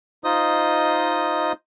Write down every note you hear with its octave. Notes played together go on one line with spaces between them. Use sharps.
D#4 F4 C5 D#5 D#6